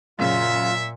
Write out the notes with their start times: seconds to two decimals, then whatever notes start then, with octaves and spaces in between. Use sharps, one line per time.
0.19 F#2 A#2 C#3 F4 E5